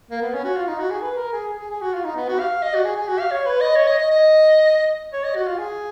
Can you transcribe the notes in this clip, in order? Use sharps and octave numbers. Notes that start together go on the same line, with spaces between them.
A#3
B3
C#4
F#4
F4
D#4
F#4
G#4
B4
A#4
G#4
G#4
G#4
G#4
F#4
F4
D#4
B3
F#4
F5
D#5
F#4
G#4
G#4
F#4
F5
C#5
B4
D#5
C#5
D#5
D#5
D#5
C#5
D#5
F#4
F4
G#4